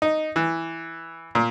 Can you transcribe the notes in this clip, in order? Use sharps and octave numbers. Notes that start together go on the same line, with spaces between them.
D#4
E3
A#2